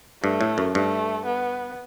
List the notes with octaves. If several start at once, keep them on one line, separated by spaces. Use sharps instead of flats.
G2 A3
A2
F#2
G2 A3
B3